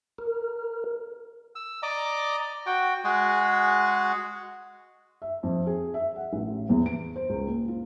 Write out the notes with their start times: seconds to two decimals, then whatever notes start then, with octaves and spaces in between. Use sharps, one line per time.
0.18 A#4
1.55 E6
1.83 D5 D#5 A#5 D6
2.66 F#4 G5
3.04 G#3 F#4 G#4
5.22 E5
5.43 F2
5.67 G#4
5.94 E5
6.16 F#5
6.33 A1
6.69 E2
6.86 D7
7.16 C5
7.29 C#2
7.48 A#2
7.68 F4